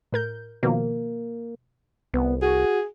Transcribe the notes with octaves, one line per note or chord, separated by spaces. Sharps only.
A2 A#4 G6
B2 D#3 F3 A#3
C2 B3
F#4 G#4